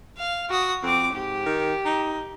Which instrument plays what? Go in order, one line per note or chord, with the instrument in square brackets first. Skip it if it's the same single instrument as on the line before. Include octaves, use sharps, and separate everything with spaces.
[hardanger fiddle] F5
F#4 D#6
[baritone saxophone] F2 [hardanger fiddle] C4 D6
[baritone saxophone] G#2 [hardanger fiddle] G4
[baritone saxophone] D#3
D#4